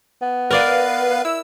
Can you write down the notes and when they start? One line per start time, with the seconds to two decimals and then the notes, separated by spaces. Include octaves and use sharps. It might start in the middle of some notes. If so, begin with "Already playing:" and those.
0.22 B3
0.51 A#4 B4 D5 D#5 F5
1.25 E4 E6